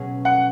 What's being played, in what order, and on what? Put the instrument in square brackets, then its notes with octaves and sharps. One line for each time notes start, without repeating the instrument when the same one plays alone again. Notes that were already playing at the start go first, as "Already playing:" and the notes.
Already playing: [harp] B2 F#3 C#4 G#4
[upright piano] F#5